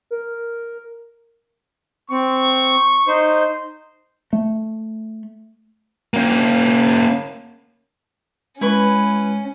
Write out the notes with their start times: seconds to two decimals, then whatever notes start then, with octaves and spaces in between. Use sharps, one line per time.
0.11 A#4
2.11 C4 C#6
3.08 D#4 C5
4.33 A3
6.14 A#3 C#4
8.61 G#3 C#4 E4 B4 C#6